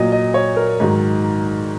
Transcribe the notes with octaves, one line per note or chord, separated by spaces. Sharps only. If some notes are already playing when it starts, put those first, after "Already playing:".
Already playing: A#2 F#3 D#5
D#5
C#5
A#4
G#2 D#3 F#3